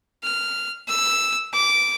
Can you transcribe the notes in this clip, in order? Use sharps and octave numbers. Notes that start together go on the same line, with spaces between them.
F6
E6
D6